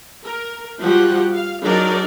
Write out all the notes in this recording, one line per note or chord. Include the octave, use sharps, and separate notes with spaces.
A#4
F3 G3 F#4 G4 F#5
F5
F#3 D4 D#4 G#4 A#4 D5